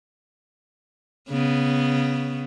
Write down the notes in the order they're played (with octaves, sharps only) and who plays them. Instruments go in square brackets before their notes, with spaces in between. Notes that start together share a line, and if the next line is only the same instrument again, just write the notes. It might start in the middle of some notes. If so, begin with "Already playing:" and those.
[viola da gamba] C#3 B3